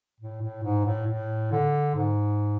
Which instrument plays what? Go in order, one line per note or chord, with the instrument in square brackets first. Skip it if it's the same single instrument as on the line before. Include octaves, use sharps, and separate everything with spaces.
[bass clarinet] A2
A2
G#2
A2
A2
D3
G#2